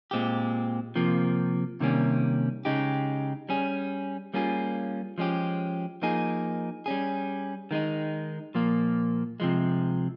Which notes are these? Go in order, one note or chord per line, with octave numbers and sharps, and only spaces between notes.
A#2 G#3 C4 G4
C3 F3 A#3
C3 D#3 G3 A#3 C#4
C#3 G#3 D#4 G4
G3 C#4 G#4
G3 A#3 C#4 F4 G#4
F3 G#3 C#4 G4
F3 A#3 D#4 G#4
G3 C#4 G#4
D#3 G#3 D#4
A#2 F3 A#3
C3 F3 G#3